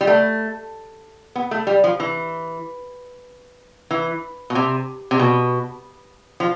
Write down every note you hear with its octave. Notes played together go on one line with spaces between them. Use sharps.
G3
A3
B3
A3
G3
F3
E3
E3
B2
C3
C3
B2
F3